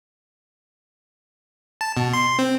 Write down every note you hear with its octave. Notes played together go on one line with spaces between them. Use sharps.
A5
B2
C6
C4